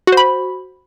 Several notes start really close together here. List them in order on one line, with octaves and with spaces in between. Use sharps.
F#4 C5 B5